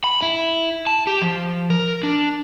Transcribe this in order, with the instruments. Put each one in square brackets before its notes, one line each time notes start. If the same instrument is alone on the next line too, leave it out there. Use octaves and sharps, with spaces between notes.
[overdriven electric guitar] B5
E4
A5
G4
F3
A#4
D4